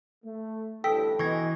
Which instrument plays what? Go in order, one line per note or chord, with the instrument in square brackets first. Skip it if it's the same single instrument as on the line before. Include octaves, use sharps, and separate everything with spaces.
[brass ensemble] A3
[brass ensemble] A1 G2 D3 [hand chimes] A4 [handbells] G5 E6 B6
[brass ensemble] B2 D#5 G#5 [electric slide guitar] E3 [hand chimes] C#6 G#6 A#6